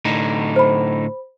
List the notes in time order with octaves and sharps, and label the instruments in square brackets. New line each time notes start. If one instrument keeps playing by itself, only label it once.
[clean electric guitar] A2 D3 D#4
[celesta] C5 B5